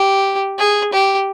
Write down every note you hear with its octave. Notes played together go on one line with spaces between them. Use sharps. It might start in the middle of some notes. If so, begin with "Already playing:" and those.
Already playing: G4
G#4
G4